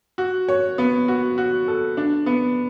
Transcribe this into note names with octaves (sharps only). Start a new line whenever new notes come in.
F#4
C#5
B3
F#4
F#4
A4
D4
B3